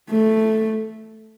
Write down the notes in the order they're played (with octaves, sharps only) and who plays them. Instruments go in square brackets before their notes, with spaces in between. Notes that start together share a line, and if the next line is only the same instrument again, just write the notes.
[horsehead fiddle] A3